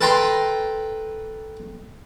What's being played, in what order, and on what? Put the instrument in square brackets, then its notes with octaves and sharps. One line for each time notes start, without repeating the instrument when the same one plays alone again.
[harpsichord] A4 B4 G5 A#5 C6